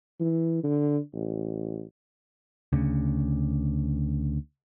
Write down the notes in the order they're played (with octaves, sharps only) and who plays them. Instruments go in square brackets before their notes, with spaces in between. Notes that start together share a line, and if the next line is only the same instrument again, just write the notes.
[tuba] E3
D3
A1
[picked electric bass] D2 C#3